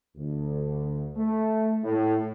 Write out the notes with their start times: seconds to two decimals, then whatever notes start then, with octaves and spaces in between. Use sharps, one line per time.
0.17 D2
1.17 A3
1.84 A2